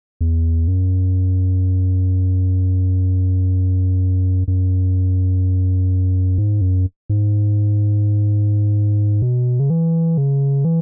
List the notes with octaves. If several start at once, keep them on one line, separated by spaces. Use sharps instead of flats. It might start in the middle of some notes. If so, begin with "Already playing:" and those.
E2
F#2
F#2
G#2
F#2
G#2
B2
C#3
E3
C#3
E3